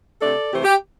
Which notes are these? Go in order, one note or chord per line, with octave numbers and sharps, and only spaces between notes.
C3 A3 D4 A4 D5
C3 E3 A3 G4 C5
G4